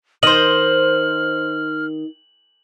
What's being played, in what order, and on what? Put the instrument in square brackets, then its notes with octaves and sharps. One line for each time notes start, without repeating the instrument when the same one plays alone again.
[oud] D#3 [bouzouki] C5 D#5 [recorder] F6 [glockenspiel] F#7